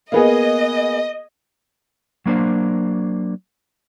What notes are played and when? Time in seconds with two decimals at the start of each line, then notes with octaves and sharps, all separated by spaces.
0.12 A#3 B3 G#4 D#5
2.26 F#3 A#3 D4 C5